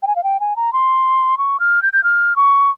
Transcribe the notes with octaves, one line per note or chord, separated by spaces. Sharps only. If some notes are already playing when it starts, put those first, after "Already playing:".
G5
G#5
F5
G5
G#5
A#5
C6
C#6
F6
G6
G6
F6
C#6